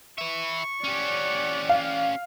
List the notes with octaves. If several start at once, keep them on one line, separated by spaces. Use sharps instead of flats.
B4 E5 C#6
C#4 G4 D5 F#5
F5